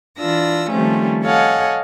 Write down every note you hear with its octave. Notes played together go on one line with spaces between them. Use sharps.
E3 D4 F4 E6 A#6
D#3 F3 G3 A3 C4 C#4
A4 C#5 D#5 F5 F#5 G#5